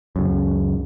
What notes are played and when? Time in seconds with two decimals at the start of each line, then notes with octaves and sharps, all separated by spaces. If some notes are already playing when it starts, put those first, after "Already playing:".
0.16 C#2 F#2